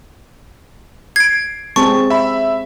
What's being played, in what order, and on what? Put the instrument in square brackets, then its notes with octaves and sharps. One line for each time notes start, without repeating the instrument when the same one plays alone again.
[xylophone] G#6 D7 [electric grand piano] C7
[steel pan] G#3 C4 G#4 [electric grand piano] A5 [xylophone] C#6
[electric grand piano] E5 B5